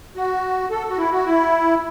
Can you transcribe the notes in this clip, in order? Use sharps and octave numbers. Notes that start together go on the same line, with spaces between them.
F#4
A4
F#4
E4
F#4
E4